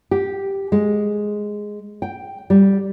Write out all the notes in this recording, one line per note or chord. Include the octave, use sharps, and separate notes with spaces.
G4
G#3
G5
G3